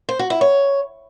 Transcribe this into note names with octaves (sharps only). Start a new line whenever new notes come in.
C5
F#4
E4
C#5